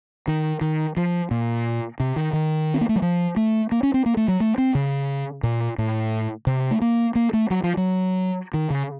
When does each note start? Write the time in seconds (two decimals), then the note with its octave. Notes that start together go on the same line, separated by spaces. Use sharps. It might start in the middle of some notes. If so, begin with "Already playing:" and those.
0.28 D#3
0.61 D#3
0.97 F3
1.31 A#2
2.00 C3
2.16 D#3
2.33 D#3
2.74 C4
2.81 A#3
2.89 A3
2.96 F#3
3.02 F3
3.36 A3
3.72 A#3
3.83 C#4
3.94 C4
4.06 A#3
4.17 A3
4.28 F#3
4.40 A3
4.58 C4
4.75 C#3
5.43 A#2
5.78 A2
6.47 C3
6.71 A3
6.81 A#3
7.15 A#3
7.33 A3
7.50 F#3
7.63 F3
7.77 F#3
8.54 D#3
8.70 C#3